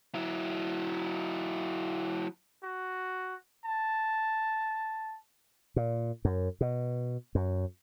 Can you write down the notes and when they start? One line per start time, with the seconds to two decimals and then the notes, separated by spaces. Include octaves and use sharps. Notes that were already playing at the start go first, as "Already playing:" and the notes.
0.14 F#3 E4
2.64 F#4
3.65 A5
5.76 A#2
6.25 F#2
6.61 B2
7.35 F#2